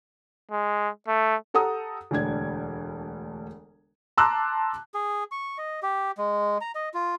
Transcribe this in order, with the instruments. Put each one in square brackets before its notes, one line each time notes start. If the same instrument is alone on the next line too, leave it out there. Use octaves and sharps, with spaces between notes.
[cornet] G#3
A3
[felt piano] G4 A4 F#5 A#5 D#6
E1 D2 D4 G#6
A5 A#5 C6 D6 E6 F#6
[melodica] G#4
C#6
D#5
G4
G#3
A#5
D#5
F4